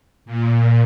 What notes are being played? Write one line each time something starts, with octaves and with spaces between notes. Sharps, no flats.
A#2